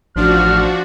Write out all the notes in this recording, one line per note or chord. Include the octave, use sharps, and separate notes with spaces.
A1 F3 D4 F#4 F6